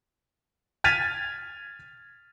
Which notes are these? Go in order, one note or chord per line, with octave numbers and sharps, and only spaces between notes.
F6 G#6 A6 B6 D#7 F7